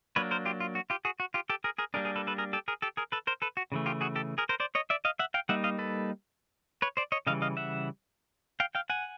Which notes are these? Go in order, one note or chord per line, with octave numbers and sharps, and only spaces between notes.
F#3 A#3 D4 B4 C#5
A#4 C5
F4 G4
F4
F#4
F4 G4
F#4 G#4
F#4
F4 G4
G4 A4
G#4 A#4
G#4 A#4
G3 A#3 D4 G#4 A#4
G#4 A#4
A4 B4
A4 B4
G#4 A#4
G4 A4
G#4 A#4
G4 A4
G#4 A#4
A4 B4
A#4 C5
A4 B4
F#4
C#3 E3 A3
F4 G4
F#4 G#4
G4 A4
G#4 A#4
A#4 C5
C5 D5
C#5 D#5
D5 E5
D#5 F5
E5 F#5
F5 G5
G3 A#3 D#4 E5 F#5
D#5 F5
A4 B4
B4 C#5
C5 D5
C#5 D#5
C#3 E3 G3 D#5 F5
D#5 F5
E5 F#5
F5 G5
F5 G5
F#5 G#5